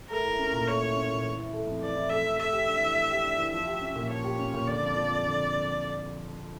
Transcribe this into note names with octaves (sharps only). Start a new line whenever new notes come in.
A3 A#4
E4
C#4
A#2
A3 C#5
E4
C#4
A#2
E3
E4
A3
F2
E3 D5
E4
A3 E5
F2
A3 E5
G4
D4
E3
A3
G4
D4
E3
F3 E5
G4
C#4
A#2
F3 C#5
G4
C#4
A#2
D3 D5
F2
F3
F2
D3